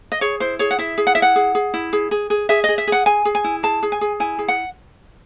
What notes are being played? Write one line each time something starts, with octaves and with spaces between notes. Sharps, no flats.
D#5
G#4 C#5
E4 C5
G#4 C#5
F#5
E4 E5
G#4
F#5
E4 E5
F#5
G#4
G#4
E4
G#4
G#4
G#4
G#4 E5
G#4 D#5
E5
G#4 F#5
G#4 G#5
G#4
G#5
E4
G#4 A5
G#4
G#5
G#4
E4 G#5
G#4
F#5